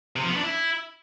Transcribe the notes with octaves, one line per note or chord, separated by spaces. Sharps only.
C3
F3
B3
D4
E4